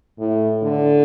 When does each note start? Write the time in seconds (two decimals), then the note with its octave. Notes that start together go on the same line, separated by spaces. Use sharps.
0.19 A2
0.62 D3